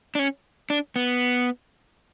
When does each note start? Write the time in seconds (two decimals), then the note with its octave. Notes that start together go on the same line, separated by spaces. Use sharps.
0.15 D4
0.19 C#4
0.70 D4
0.96 B3